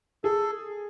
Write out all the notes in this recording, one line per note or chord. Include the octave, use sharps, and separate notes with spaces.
G#4 A4